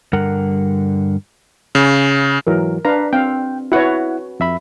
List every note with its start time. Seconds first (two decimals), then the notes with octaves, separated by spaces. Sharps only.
0.13 G2 D3 G3 A#4 F#5
1.75 C#3
2.47 G#2 E3 F#3 A#4
2.85 D4 B4 F5 A#5
3.13 C4 F5 G5
3.72 E4 F#4 B4 C#5 F#5
4.40 F2 E5 B5